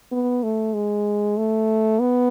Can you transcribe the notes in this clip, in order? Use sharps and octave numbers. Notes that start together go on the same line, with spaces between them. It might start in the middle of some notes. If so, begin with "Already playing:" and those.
B3
A3
G#3
A3
B3